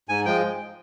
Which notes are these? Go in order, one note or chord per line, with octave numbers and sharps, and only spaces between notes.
G#2 G#5
F3 G#3 G5